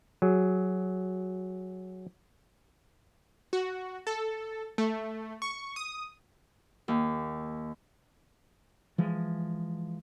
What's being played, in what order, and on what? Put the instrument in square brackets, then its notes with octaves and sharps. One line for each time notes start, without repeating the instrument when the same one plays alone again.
[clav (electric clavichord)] F#3 G#4
[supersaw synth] F#4
A4
A3
C#6
D#6
[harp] D#2
[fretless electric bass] E3 F3 G#3